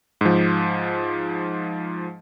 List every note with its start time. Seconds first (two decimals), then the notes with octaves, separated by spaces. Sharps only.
0.21 G#2 F3